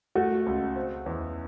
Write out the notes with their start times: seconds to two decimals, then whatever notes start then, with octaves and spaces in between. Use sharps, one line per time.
0.15 A3 F#4
0.46 C#2
0.76 C4
1.06 E2